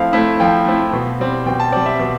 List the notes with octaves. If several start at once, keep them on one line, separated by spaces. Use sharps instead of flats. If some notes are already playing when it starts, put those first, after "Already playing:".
Already playing: F3 A3 C4 E4 F5
A3 C4 E4
F3 G5
A3 C4 E4
B2
G3 C4
B2 G5
A5
G3 C4 D5
E5
B2